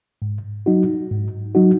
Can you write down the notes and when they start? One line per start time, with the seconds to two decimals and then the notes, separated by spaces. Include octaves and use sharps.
0.22 G#2
0.66 F#3 D#4 F#4
1.11 G#2
1.55 F#3 D#4 F#4